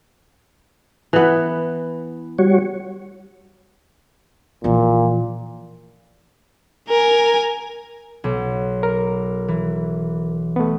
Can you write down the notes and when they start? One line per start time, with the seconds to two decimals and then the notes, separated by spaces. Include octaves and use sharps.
1.13 E3 B3
2.39 G3 F#4 C#5
4.64 A#1 A#2 E3
6.90 A#4 G#5
8.24 B1
8.83 A#4
9.48 E3
10.56 A3 B3